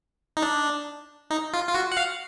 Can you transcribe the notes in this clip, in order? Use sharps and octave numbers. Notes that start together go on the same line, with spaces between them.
D#4
D4
D#4
F4
F4
F#4
F#5
F5